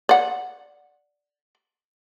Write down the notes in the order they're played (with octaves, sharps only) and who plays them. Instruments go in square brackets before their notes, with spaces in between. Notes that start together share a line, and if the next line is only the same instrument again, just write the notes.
[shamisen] D5 F#5